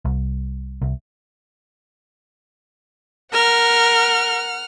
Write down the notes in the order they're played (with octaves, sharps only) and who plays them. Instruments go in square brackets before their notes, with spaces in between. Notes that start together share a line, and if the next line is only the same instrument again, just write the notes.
[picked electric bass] C2
C2
[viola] A#4 [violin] F#5 F6